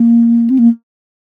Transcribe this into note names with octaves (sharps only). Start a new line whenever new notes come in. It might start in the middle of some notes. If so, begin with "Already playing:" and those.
Already playing: A#3
C4
A#3